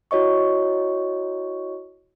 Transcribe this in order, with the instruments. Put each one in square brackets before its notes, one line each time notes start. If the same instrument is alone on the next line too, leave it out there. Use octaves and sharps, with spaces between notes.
[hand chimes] E4 F#4 C#5 D#5 C#6